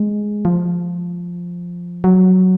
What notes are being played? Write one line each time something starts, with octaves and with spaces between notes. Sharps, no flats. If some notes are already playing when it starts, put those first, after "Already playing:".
Already playing: G#3
F3
F#3